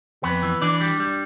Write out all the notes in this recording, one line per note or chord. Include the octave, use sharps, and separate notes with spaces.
F2 B3 B4
E3
E3 D4 D5
G3
G3